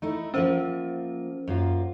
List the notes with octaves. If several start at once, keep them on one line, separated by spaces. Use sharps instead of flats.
A3 D#4 E4
F3 A#3 C#4 C5 E5
F#2 A#3 F4